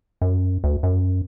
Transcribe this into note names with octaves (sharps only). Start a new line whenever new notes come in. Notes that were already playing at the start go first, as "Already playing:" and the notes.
F#2
D2
F#2